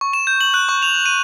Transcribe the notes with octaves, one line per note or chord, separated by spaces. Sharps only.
C#6
E7
G6
F#7
F#6
C#6
F7
D#7